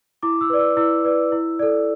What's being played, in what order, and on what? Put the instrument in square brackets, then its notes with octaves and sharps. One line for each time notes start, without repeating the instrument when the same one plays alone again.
[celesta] E4 D6
E6
B4 D5
E6
E4 E6
B4 D5
E4
A4 D5